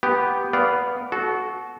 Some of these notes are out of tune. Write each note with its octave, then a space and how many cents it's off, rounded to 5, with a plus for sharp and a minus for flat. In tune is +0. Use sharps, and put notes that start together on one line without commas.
B3 +0 G4 +0
B3 +0 D5 -15 F5 -10
F#4 +0 A4 -30